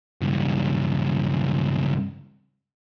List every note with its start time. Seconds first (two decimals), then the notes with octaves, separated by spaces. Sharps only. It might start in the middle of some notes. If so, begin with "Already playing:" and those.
0.21 C#2 G2